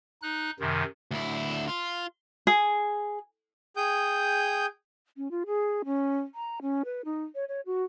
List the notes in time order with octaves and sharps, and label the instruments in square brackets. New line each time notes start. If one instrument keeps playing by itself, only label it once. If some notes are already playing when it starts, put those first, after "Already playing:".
[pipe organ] D#4 F#6
F#2 C3 D#3
[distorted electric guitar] D2 E4
F4
[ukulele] G#4
[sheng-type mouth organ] G#4 G5 D#6 G6
[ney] C#4
F4
G#4
C#4
A#5
C#4
B4
D#4
C#5
C#5
F#4